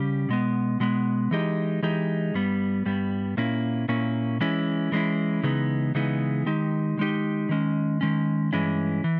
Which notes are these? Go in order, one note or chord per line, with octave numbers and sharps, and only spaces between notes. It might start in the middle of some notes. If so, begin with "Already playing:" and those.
Already playing: C#3 G3 C#4 G4
B2 G#3 B3
B2 G#3 B3
E3 G#3 D#4 G4
E3 G#3 D#4 G4
G2 G3 B3
G2 G3 B3
A#2 A#3 C#4 E4
A#2 A#3 C#4 E4
E3 G#3 C#4 E4
E3 G#3 C#4 E4
C#3 E3 G#3 B3 D#4
C#3 E3 G#3 B3 D#4
D#3 G#3 D#4 G4
D#3 G#3 D#4 G4
D#3 G#3 C#4
D#3 G#3 C#4
G2 E3 G#3 C#4 E4
E3